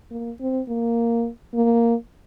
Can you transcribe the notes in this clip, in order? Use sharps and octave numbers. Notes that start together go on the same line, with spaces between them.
A#3
C4
A#3
A#3